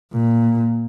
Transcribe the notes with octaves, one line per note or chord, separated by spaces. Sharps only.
A#2